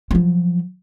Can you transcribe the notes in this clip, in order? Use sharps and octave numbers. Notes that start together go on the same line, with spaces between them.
F3 F#3